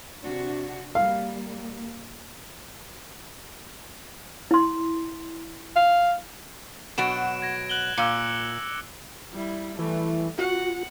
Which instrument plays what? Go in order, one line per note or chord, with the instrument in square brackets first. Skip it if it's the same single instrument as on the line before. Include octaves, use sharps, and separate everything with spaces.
[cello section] C3 D4 F#4
[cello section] G3 A#3 [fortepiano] F5
[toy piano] E4 C6
[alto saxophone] F5
[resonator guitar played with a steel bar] B2 F#3 F#4 [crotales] D7 E7
[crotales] G#6 A#6
F#6 F#7 G7
[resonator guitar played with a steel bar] A#2 [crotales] D6 E6 C#7
[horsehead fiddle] G3 E4
[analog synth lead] E3 [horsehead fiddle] G3 A3
[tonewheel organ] F4 [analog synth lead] F#4 [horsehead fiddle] F#5